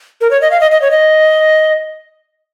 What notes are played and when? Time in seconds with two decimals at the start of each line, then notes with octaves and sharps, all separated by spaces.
0.21 A#4
0.31 C#5
0.41 D#5
0.51 F5
0.60 D#5
0.71 D#5
0.82 C#5
0.91 D#5